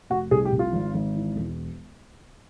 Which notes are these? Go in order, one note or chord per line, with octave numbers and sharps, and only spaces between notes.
F1 F#4
C2 G#4
G4
C2
F4
G#1
G#1
E3
E1